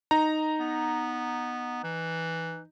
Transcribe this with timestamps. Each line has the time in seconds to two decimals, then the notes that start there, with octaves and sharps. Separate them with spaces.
0.11 D#4 A#5
0.60 B3
1.84 E3